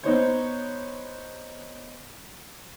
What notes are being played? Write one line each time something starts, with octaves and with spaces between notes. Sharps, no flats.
B3 D#4 C5 C#5